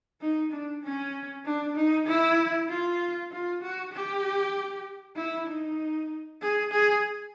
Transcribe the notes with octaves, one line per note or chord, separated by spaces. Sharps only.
D#4
D4
C#4
D4
D#4
E4
F4
F4
F#4
G4
E4
D#4
G#4
G#4